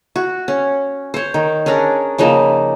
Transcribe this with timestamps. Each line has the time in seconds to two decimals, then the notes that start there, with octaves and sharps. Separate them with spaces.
0.16 F#4
0.48 C#4
1.14 C5 C#5
1.34 D#3
1.66 C#4 D4 G#4 A#4
2.18 C#3 F3 A#3 D#4